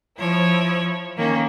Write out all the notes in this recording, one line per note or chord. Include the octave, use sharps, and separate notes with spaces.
F3 E4 C#5
D#3 A#3 C#4